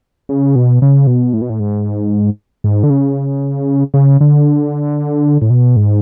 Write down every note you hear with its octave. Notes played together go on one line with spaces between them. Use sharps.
C#3
B2
C#3
B2
A2
B2
A2
G#2
G#2
D3
C#3
C#3
D3
A2
B2
G#2